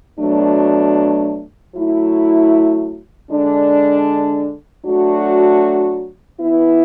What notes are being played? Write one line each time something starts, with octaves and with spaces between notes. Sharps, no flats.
B2 F#3 A3 D4
F#3 A3 E4
D3 G#3 D4
F#3 A3 D4 F#4
E3 B3 E4